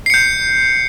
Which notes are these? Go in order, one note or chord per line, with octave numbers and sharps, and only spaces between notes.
G6 C7 C#7